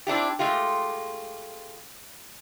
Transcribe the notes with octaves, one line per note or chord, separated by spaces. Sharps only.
C4 D4 E4 G4
G#3 A3 F4 G4